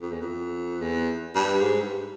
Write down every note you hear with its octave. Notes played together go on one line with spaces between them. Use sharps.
F2
E2
F2
E2
G2
G#2
G2